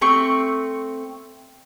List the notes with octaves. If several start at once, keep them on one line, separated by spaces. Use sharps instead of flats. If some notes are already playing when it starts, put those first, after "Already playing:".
A3 C4 C#6